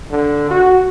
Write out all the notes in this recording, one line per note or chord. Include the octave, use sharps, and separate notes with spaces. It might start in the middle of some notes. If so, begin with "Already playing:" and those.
D3
F#4